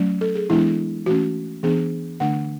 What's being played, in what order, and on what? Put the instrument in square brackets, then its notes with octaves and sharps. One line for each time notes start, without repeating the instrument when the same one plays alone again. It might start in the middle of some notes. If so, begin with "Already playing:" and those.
Already playing: [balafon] F#3 A3 C#4
A4
G#4
E3 G#3 B3 D4 E4
E3 A3 C#4 F#4
E3 B3 D4 G#4
D3 A3 D4 F#5